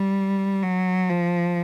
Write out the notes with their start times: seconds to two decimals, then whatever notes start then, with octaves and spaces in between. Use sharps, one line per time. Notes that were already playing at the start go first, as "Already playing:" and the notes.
Already playing: G3
0.63 F#3
1.10 F3